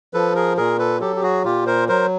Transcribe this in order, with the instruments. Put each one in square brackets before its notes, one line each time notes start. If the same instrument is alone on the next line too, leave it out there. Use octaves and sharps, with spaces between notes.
[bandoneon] F3 A4 B4
G#4 A#4
A#2 G#4 A#4
A4 B4
F#3 G4 A4
G4
F#4 G#4
A#2 F4 G4
A#4 C5
F#3 A#4 C5